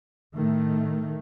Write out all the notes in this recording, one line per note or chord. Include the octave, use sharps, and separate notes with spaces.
A2 D#3 A3